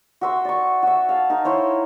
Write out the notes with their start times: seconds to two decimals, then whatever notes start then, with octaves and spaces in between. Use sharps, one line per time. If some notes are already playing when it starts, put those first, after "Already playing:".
0.21 F#4 E5 C6
0.45 D5 C#6
0.83 F#4 E5
1.09 F5 A5
1.29 D#4 A#4
1.45 E4 C5 C#5